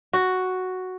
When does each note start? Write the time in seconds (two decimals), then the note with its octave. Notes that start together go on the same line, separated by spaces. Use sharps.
0.13 F#4